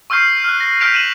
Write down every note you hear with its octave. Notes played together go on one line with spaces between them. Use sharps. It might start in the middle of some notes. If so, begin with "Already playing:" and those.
C#6 E6 F6 G6 C7
F6 F#6
A#6
F6 G6 B6 D7 F7
D#7 E7 F#7